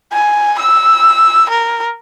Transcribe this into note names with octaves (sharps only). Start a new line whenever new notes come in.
G#5
E6
A#4